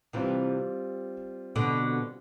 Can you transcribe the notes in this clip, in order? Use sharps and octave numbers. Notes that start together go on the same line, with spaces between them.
C3 E3 G3 C4 F4
B2 D3